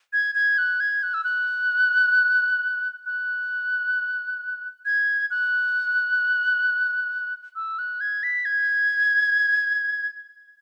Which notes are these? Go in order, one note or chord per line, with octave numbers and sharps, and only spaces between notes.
G#6
G#6
F#6
G#6
F#6
E6
F#6
F#6
G#6
F#6
E6
F#6
G#6
B6
G#6